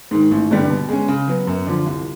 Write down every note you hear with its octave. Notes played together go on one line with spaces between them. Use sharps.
G#2 D#3
A1
G2 D3 G3
B2
G#3 C#4
C#3
F#3 B3
F#2
D3 F3
C2